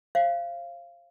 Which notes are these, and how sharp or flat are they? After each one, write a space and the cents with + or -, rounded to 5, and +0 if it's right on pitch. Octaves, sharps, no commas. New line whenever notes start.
C5 +40 F5 -20